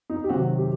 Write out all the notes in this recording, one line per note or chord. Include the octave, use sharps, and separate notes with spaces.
D#4
G4
C3 D#3 F#3 F#4
G4